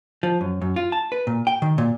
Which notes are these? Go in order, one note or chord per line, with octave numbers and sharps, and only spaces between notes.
F3
F#2
F#2
F4
A5
B4
A#2
G5
D#3
A#2